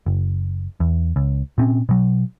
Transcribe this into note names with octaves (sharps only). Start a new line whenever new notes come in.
F#1
E2
C#2
A#2 C4 C#4
B2 F#3